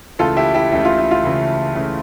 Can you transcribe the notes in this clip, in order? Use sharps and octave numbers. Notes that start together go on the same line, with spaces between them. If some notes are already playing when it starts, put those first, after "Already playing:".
C#2 C#3 E3 A3 F4 A4
E4 G4
E4 G4
C#2 C#3 E3 A3 E4
F4
E4
F4
C#2 C#3 E3 A3
C#2 C#3 E3 A3